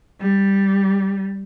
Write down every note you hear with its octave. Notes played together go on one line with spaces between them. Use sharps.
G3